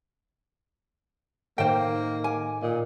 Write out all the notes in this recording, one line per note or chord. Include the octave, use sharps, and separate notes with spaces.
A2 D#3 A#3 C5 G5
G#5 D6
A#2 D#5